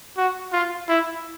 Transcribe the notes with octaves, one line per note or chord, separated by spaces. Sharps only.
F#4
F4
E4